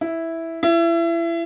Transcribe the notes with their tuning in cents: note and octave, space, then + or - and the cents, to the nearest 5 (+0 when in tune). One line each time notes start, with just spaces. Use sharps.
E4 -5
E4 +30